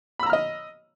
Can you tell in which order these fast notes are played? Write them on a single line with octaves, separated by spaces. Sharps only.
B5 E6 A#5 F6 D#5